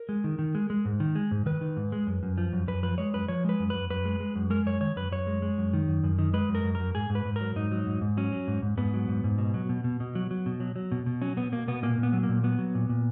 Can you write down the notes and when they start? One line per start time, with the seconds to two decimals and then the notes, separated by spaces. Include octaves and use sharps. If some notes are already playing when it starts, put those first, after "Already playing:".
Already playing: A#4
0.09 G#3
0.24 D#3
0.39 D#3
0.55 G#3
0.70 G#3
0.85 G#2
1.00 D#3
1.15 G#3
1.31 G#2
1.46 D#3 B4
1.61 D#3
1.77 G#2
1.92 G#3
2.07 F#2
2.23 F#2
2.38 F3
2.53 F#2
2.68 F#2 B4
2.83 F3 B4
2.98 G#3 C#5
3.14 F#2 B4
3.28 F3 C#5
3.45 G#3 B4
3.59 F#2
3.70 F#2 B4
3.90 F#2 B4
4.05 G#3
4.20 G#3
4.36 F#2
4.50 G#3 A#4
4.66 F#2 C#5
4.81 D#3 C#5
4.96 F#2 B4
5.11 F#2 C#5
5.27 G#3
5.42 G#3
5.58 F#2
5.73 D#3
5.88 F#2
6.04 F#2
6.19 D#3
6.34 G#3 B4
6.49 F#2
6.55 A#4
6.64 F#2
6.75 A#4
6.80 F#2
6.95 G#2 G#4
7.10 G#2
7.15 B4
7.25 G#2
7.36 F#3 A#4
7.56 G#2 D#4
7.72 F#3
7.87 G#2
8.01 G#2
8.17 F#3 C#4
8.32 F#3
8.48 G#2
8.62 G#2
8.78 G#2 B3
8.94 F#3
9.09 G#2
9.24 G#2
9.38 B2
9.54 F#3
9.69 B2
9.84 B2
10.00 B2
10.15 F#3
10.31 F#3
10.46 B2
10.60 F#3
10.76 F#3
10.92 B2
11.06 B2
11.22 F#3 C#4
11.37 B2 B3
11.52 B2 A#3
11.68 B2 B3
11.83 A#2 A#3
11.98 A#2
12.03 B3
12.13 F#3
12.23 A#3
12.29 A#2
12.43 F#3 B3
12.59 F#3
12.75 A#2
12.89 A#2